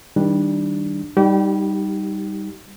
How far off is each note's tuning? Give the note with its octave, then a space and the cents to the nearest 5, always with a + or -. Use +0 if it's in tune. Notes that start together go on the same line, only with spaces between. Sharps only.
D#3 +30 G3 +0 D4 +5
G3 +0 D#4 +0 G4 -30